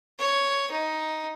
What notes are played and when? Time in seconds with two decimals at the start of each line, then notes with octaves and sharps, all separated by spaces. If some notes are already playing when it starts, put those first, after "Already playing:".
0.19 C#5
0.71 D#4